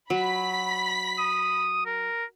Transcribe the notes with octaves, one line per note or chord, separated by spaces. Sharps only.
F#3 B5 B6
D#6
A#4